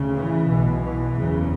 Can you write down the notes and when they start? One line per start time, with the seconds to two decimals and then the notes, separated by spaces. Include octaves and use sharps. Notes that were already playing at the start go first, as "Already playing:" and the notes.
Already playing: D2 C#3
0.15 E3
0.48 B1 B2
0.82 E3
1.14 F#1 E2 C#3